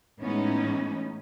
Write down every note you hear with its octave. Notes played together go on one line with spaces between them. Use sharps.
A2 E3 G#3 B3 C#4 D#4